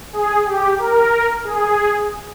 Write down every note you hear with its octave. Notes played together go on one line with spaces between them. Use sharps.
G#4
G4
A#4
G#4